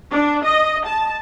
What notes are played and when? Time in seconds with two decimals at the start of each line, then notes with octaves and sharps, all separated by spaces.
0.13 D4
0.45 D#5
0.87 A5